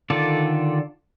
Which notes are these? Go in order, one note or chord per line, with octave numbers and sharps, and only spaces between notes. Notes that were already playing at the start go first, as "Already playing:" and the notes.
D3 D#3 F4 A4 D5